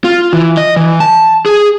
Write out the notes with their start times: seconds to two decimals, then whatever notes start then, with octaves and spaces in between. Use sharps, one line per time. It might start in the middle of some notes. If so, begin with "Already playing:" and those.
0.04 F4
0.33 E3
0.57 D#5
0.76 E3
1.00 A5
1.46 G#4